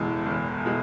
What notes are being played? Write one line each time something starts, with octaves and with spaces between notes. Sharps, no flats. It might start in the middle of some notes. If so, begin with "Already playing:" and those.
Already playing: F#1 E2 B2 G#3 A4
F#1
B2 G#3